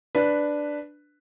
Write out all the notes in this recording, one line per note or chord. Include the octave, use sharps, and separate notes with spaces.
D4 B4